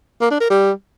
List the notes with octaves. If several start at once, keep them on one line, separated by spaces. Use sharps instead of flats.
A#3
D4
A#4
G3